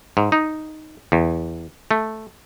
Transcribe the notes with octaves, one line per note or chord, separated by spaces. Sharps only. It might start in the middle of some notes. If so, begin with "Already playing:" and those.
G#2
D#4
E2
A3